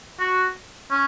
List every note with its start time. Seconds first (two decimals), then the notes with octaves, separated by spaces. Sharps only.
0.20 F#4
0.91 C#4